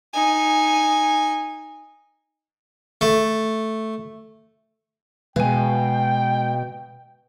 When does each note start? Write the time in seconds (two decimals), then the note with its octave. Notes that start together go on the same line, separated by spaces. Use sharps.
0.13 D#4 G#5
3.01 A3
5.36 B2 G#3 B4 F5 G5 G#5